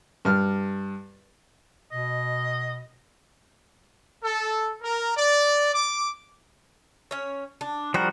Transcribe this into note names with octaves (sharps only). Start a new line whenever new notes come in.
G2 F6
B2 D#5
A4
A#4
D5
D6
C#4 C#5
D4
F3 G3 F#4 A#4